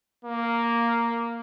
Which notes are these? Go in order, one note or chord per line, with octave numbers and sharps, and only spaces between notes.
A#3